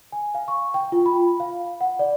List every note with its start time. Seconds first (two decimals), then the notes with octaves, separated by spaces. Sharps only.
0.12 G#5
0.35 F5
0.48 C#6
0.74 G5
0.92 F4
1.06 B5
1.40 F5
1.81 F#5
1.99 D5